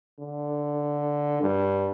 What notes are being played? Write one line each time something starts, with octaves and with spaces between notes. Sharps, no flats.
D3
G2